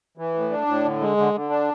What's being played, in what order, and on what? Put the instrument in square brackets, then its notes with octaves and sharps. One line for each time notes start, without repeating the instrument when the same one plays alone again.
[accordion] E3
A2
D4
A2
D3
G#3
D3
D3
D4